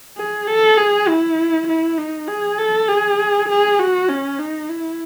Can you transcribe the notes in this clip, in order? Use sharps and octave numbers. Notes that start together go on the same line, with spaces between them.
G#4
A4
G#4
E4
E4
D#4
G#4
A4
G#4
G#4
F#4
C#4
D#4
E4